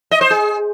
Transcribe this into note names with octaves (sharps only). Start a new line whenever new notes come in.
D#5
C5
G#4